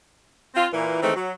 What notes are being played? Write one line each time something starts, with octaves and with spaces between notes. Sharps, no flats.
C4 F4
A#2 E3
D#3 E3 G#3 A3 C4
F#3